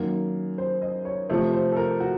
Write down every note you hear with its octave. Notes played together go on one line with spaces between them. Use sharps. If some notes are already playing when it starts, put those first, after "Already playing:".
Already playing: F#2 D#3 A#3 F#4
C5
D#5
C#5
C3 F3 A3 C5
C5
A4
A#4
F#4